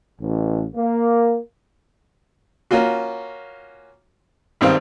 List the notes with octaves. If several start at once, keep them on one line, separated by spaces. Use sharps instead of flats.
A1
A#3
A#3 C#4 F4 F#4
G#1 G2 D#3 C4 C5 F5